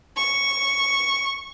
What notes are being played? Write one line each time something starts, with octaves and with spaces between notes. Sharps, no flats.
C#6